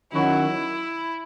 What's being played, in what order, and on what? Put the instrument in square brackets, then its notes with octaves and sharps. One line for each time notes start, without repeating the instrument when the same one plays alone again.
[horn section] D#3 F#3 C#4 F#4 [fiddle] E4